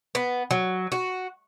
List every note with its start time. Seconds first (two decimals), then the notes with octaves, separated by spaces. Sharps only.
0.15 B3
0.51 F#3
0.92 F#4